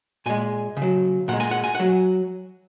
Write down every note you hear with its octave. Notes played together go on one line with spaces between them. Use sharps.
A#2 G#3 G#5
C#3
F#3
A#2 G#3 F#5
G#5
F#5
G#5
F#3 F#5